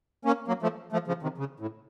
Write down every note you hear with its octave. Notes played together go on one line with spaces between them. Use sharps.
A#3 C#4
F#3 A#3
F3 A3
F3 A3
C#3 F3
C3 D#3
C#3
A2